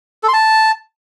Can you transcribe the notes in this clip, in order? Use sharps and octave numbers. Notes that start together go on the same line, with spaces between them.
A4
C6
A5